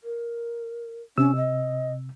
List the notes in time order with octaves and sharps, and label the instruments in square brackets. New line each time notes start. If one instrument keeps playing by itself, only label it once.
[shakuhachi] A#4
[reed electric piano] C3 E6 [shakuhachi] C#4
[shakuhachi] D#5